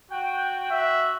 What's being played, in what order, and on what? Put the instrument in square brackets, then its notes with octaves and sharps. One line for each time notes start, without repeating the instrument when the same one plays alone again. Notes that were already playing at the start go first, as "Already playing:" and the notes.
[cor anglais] F#4 [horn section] G5
[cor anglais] F#4 [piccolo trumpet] E5